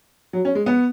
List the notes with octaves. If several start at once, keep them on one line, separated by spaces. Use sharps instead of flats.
F#3
C#4
G#3
B3